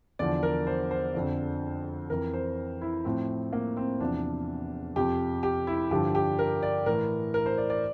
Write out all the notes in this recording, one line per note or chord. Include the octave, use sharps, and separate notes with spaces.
E2 D3 F3 D5
A#4
C5
C5
F2 D3 F3
F2 E3 A#4
C5
E4
A2 F3 C4
A#3
C4
E2 C3 F3 D4
F2 C3 F3 G4
G4
E4
G2 D3 F3 G4
G4
A#4
D5
A2 E3 A#4
A#4
C5
D5
D5